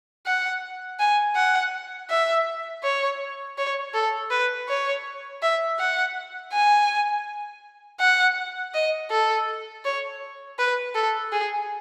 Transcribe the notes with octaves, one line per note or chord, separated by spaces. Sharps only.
F#5
G#5
F#5
E5
C#5
C#5
A4
B4
C#5
E5
F#5
G#5
F#5
D#5
A4
C#5
B4
A4
G#4